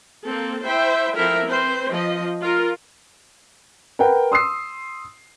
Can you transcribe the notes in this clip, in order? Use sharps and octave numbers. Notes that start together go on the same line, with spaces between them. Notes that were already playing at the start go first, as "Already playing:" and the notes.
A#3 C4 A4
E4 C5 E5 G5
F3 C4 E4 A4 A#4 E5
C4 B4 C5
F3 D#5
F4 A#4
A#4 B4 F#5 G5
C6 D#6 E6 C7